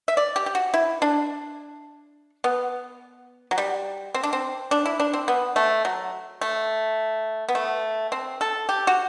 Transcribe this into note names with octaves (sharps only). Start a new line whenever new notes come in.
E5
D5
G4
G4
F#4
E4
D4
B3
F#3
G3
C4
D4
C4
D4
E4
D4
C4
B3
A3
F#3
A3
B3
A3
C4
A4
G4
F#4